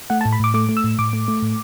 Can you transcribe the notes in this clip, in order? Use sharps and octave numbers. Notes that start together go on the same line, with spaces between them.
A3 F#5
A5
A2
B5
A2 D6
A3 D6
A3
E6
A2
A2 D6
A3
A3
A2